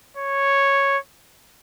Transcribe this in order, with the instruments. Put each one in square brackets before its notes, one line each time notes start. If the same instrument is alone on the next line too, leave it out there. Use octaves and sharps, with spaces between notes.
[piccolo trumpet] C#5